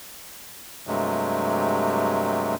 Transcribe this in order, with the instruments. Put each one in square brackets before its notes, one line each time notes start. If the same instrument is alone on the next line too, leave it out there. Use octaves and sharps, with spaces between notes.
[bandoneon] G2 C3 F#3 G#3 A3